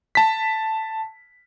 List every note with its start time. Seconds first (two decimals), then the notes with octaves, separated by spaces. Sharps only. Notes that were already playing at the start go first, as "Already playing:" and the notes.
0.15 A5 B6